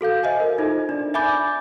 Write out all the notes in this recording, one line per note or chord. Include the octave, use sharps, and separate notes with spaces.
F#4 A4 F5 G6
C5 D#5 E5 G#5
A#4
D#4 F4 A4 C5
D4 D5
E5 G#5 B5 D6 G6 A6